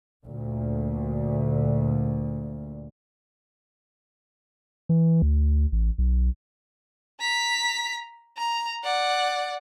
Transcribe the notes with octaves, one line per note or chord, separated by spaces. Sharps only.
D2 A#2
E3
D2
A1
B1
A#5 B6
A#5
D5 F#5